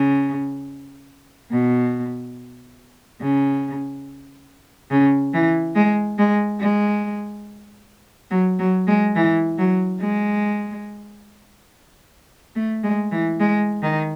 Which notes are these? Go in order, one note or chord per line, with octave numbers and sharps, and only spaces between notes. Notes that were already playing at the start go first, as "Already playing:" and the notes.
Already playing: C#3
B2
C#3
C#3
E3
G#3
G#3
G#3
F#3
F#3
G#3
E3
F#3
G#3
A3
G#3
E3
G#3
D#3